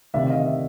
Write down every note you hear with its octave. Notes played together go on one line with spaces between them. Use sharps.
D2 C3 D#3 D5 E5
D#5 F5
D5 E5